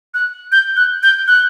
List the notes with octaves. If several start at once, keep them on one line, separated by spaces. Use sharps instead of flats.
F#6
G6
F#6
G6
F#6